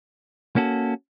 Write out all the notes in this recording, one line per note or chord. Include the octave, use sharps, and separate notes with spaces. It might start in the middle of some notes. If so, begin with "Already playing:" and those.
A#3 C#4 F#4 A4